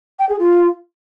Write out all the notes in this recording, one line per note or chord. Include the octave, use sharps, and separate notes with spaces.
G5
G#4
F4